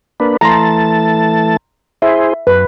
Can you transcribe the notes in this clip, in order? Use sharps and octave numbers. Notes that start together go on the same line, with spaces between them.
A#3 D4 B4
E3 A3 A5 A#5 C6
E4 G#4 C5 E5
F#2 B4